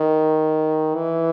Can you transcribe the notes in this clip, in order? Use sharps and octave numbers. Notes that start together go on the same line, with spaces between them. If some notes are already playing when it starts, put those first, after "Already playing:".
Already playing: D#3
E3